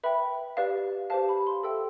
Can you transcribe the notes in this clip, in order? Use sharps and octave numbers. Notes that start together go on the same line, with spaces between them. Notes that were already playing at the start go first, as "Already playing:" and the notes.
B4 E5 G5 B5
G4 B4 D5 F5
G4 C5 F5 A5
B5
C6
A4 E5 G5 E6